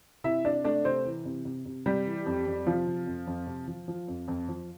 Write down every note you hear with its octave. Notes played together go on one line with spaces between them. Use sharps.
C3 E4 E5
C3 D4 D5
A3 D4 D5
C3 C4 C5
E3
C3
C3
C3
C3 G3 G4
E3
F2
F2
C3 F3 F4
C3
F2
F2
C3
F3
F3
F2
F2
F3